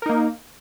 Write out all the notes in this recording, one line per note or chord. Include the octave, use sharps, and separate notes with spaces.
A#3 D#4 A#4